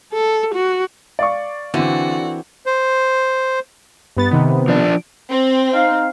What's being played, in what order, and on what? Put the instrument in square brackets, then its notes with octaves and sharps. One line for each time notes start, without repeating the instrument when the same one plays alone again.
[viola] A4
F#4
[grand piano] D5 F5 C#6
[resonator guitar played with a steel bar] D3 [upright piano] E3 C4 [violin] F#4
[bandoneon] C5
[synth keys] G2 B3 A6
C3 D#3 B3
[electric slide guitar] F3 D4
[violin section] C4
[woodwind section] D#4 F5